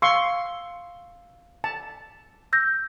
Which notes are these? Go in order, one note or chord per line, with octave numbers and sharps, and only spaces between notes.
F5 C6 C#6 E6
A5
E6 G6 A#6